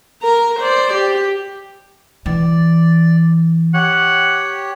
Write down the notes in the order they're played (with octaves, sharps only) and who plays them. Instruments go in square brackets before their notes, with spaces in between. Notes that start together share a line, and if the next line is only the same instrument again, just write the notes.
[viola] A#4 A#5
C5 D5
G4
[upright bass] E3 [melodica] D5
[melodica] G4 C#5 [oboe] F#5